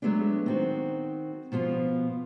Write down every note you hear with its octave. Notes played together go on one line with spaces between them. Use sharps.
F#3 G#3 A3 B3 D4
D#3 C4 F#4
B2 F3 B3 F4